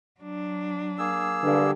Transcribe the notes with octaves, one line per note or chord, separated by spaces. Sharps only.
F#3 D4
A#3 G#4 E6
G2 D3